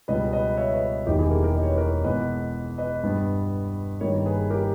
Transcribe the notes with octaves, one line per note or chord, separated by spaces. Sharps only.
C#2 B2 G3 B3 B4 D#5
B4 D#5
C#5 E5
B4 D#5
E1 E2 D#3 A#3 D#4 G4
E4 G#4
G4 A#4
G4 A#4
D#5
C#5
B4
A#4 C#5
E2 B2 G#3 B3 B4 D#5
B4 D#5
G2 G3 B3
G1 G2 D#3 G3 A#3 A#4 C#5
G#4 B4
G4 A#4